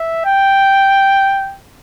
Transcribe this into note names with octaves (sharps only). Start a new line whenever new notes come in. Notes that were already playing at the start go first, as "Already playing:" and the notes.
Already playing: E5
G5